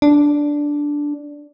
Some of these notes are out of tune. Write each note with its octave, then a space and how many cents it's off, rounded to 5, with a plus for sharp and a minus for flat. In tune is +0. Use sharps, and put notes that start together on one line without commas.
D4 -5